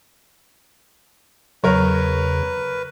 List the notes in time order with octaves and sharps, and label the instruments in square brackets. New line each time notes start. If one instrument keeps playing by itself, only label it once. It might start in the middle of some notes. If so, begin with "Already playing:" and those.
[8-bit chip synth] E2 C#3 [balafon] F#3 [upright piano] A#4 C#5 [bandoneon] B4